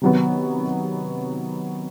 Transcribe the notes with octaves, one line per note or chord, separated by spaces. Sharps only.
C3 D#3 F#3 B3